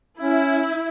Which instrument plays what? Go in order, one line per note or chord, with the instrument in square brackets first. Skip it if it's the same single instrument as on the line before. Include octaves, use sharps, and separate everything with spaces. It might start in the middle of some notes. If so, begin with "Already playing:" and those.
[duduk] C#4 [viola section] E4